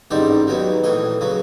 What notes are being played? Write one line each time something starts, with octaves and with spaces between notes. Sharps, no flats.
A1 G#2 D#3 G3 C4 D5
D#2 D#3 F#3 B3
A#1 A2 E3 D#5
C#3 F#3 B3